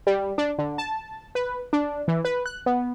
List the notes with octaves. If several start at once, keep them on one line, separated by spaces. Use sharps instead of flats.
G3
D4
D3
A5
B4
D4
E3
B4
F#6
B3